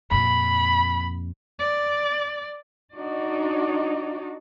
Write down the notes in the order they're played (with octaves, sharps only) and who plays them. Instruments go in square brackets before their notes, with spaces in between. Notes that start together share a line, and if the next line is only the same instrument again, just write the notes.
[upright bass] F2 A#2 [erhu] B5
[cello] D5
[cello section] D4 D#4 F#4 D5